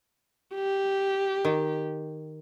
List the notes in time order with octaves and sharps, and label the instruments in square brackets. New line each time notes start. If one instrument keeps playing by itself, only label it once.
[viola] G4
[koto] D#3